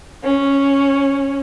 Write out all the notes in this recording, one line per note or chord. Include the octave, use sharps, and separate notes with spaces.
C#4